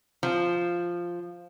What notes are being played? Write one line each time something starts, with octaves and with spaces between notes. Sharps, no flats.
F3